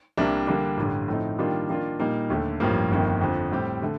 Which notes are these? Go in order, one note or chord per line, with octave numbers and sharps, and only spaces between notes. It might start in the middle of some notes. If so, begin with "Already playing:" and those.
C2 C3 G3 A#3 D4
D3 G3 A#3 D4
A1 G2 D3
A2 F3 A3 C4 D#4
D#3 G3 A#3 D4 F4
D#3 A#3 D4 F4
A#2 G3 A#3 D#4
D#2 D3 A3
A1 G2 F3 A#3
G1 F2 D#3 A#3
F2 D3 F3
A2 G3 C4 G4
D3 A3